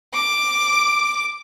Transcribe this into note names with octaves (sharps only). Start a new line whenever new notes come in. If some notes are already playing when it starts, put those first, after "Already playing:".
D6